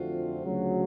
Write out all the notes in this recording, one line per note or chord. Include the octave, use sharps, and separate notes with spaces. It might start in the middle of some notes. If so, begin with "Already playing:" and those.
Already playing: F2 D3 F3 A3 C4 F4 F#4
D2 C#3 F#3